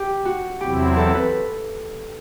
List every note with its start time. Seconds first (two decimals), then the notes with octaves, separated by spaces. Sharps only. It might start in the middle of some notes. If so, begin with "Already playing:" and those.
Already playing: G4
0.25 F#4
0.61 E2 C3 F#3 C4 E4 G4
0.97 A4
1.15 B4